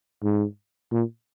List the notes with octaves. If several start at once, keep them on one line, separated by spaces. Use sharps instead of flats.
G#2
A#2